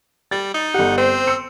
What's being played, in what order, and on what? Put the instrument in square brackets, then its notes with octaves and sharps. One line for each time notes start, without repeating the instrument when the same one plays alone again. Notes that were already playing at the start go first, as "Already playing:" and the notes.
[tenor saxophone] G3 [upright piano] A6
[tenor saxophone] D#4
[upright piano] G1 G4 [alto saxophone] F#5
[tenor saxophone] C4 [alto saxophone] C5
[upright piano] C6 E6 C#7